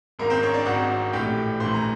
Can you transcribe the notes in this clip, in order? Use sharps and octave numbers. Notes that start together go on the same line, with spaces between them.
G#1 G#2 D#3 A#3 A#4
C4 C5
C#4 C#5
D4 D5
G#1 G#2 D#3 F#4 F#5
A#1 A2 E3 G4 G5
A#1 A2 E3 C5 C6
A#5